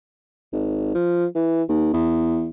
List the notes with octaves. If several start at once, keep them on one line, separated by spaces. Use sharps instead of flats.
G#1
F3
E3
D#2
E2